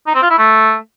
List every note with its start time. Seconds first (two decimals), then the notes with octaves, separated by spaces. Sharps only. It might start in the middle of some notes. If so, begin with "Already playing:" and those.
0.07 D#4
0.14 C4
0.22 F4
0.30 E4
0.38 A3